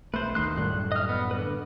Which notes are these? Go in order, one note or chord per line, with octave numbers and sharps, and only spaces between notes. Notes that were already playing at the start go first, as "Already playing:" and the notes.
B1 A3 B4 C5
D#2 D#3 C6 F#6
F#2 A2 G3 F#6
D#5 F6
B3
D3 B4